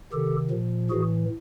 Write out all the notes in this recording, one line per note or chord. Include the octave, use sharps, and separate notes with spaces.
C3 D#3 G4 A4
A#2 F3
A2 E3 F#4 G#4